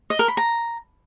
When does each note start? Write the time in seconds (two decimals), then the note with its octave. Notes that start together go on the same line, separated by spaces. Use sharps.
0.10 D#5
0.19 A#4
0.28 B5
0.37 A#5